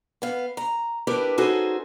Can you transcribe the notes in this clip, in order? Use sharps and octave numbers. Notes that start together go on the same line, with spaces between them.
B3 F5
A#5
D4 E4 G4 A#4 B4
C#4 D#4 F#4 G#4 A4 C5